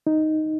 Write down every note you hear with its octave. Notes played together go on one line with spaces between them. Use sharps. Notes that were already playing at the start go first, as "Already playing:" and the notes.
D#4